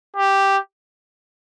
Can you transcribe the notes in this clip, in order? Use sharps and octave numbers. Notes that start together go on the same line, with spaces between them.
G4